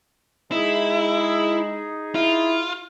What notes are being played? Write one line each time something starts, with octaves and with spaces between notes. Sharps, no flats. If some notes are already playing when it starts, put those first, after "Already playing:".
G#3 D#4 E4 G#4
E4 F4